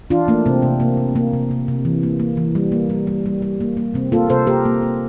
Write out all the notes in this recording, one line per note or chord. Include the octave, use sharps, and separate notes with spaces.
E3 D4 F4
A3 A#3 D4
C3 C4
C3
C3 A#3
C3
C3 A#3
C3
C3
C3
E3
A#3
A#3
E3
G3
A#3
G3
G3
G3
G3
A#3
A#3
C3 C4
A#3 F4 A4
C3 A4 C5
A#3 G4 A#4
A#3
A#3